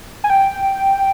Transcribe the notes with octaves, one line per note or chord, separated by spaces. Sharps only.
G#5
G5